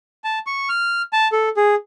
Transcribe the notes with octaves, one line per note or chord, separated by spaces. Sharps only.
A5
C#6
F6
A5
A4
G#4